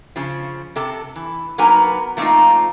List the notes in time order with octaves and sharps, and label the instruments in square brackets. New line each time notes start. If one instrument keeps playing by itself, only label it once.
[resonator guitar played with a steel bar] C#3 F3
C3 A4 A5
E3
F#3 A#3 B3 D#4 A#4 G#5
F3 A3 A#3 C4 D#4 F4